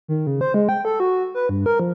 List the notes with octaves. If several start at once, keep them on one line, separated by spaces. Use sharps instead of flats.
D#3
C#3
C5
G#3
G5
A4
F#4
B4
G2
A#4
F3